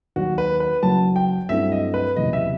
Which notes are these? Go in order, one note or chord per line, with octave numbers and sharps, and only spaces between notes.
D#2 D#3 F#3 F#4
B4
B4
F#1 F#2 F#3 A5
G5
G2 F#3 A3 C4 E4 E5
D#5
B4
F#1 E2 C3 D#5
E5